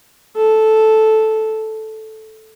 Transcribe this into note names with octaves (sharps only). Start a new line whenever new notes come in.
A4